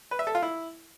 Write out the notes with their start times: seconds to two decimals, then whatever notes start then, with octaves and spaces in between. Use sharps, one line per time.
0.11 B4
0.19 E5
0.27 A4
0.35 F4
0.42 E4